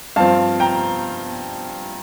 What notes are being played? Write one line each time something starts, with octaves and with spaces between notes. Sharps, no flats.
G2 F3 C4 F5 A5
G5 A#5